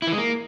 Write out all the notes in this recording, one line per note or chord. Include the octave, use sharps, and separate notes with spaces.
E4
E3
G#3
A#3